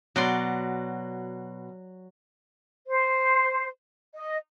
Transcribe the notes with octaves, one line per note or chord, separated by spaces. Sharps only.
B2 F#3 D5 C6
C5
D#5